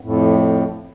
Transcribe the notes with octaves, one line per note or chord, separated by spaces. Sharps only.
F2 A2